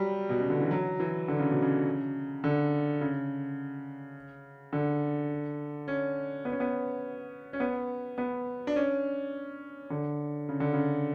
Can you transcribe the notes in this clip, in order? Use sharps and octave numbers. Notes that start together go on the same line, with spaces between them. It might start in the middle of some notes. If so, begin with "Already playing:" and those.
Already playing: F#3 G3
B2
C#3
D3
E3
F#3
E3
D3
C#3
B2
C#3
D3
C#3
D3
C#4
B3
C#4
B3
C#4
B3
B3
D4
C#4
D3
C#3
D3
C#3